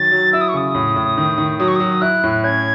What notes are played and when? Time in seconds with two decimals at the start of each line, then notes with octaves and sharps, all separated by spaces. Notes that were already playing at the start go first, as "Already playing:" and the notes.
Already playing: D#3 F#3 A6
0.12 F#3
0.33 E4 E6
0.41 D#6
0.49 C#6
0.54 C#3 D#6
0.75 A2
0.96 A2
1.18 D#3
1.38 D#3
1.59 F#3 D#6
1.68 C#6
1.76 F#3 D#6
2.01 E4 F#6
2.24 A2
2.44 C#4 G#6